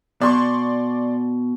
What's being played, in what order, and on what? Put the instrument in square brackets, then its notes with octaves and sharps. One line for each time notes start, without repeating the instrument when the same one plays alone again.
[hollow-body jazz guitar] B2 [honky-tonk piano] D5 C6 C#6